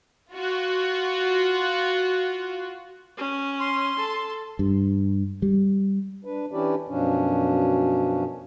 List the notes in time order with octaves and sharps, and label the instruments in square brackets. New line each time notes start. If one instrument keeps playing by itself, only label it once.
[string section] F4 F#4
[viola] C#4
[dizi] C6
[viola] A4
[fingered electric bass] G2
G3
[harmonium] D4 B4
E3 C#4 D4 E4 G4 D5
F#2 B2 F3 C#4 D4